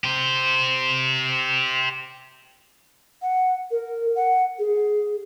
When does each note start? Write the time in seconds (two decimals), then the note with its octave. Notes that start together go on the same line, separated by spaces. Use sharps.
0.04 G4 C5
3.22 F#5
3.71 A#4
4.16 F#5
4.59 G#4